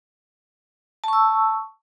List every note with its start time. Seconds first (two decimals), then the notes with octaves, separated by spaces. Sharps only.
1.04 A5
1.08 C#6
1.13 E6